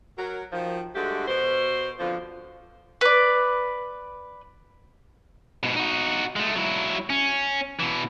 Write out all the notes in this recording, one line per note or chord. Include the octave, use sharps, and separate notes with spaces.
F#3 A#4
D#3 F3
G2 D3 G#3 A3 F#4 G4
B2 C5
F2 B2 D3 F3
B4 D5
G#2 B2
D#4 F#4
G#3 A3
F#3 E4
C#4
B2 E3